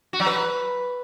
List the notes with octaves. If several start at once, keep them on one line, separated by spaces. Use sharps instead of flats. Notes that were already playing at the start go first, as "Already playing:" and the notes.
F#4
F#3
B4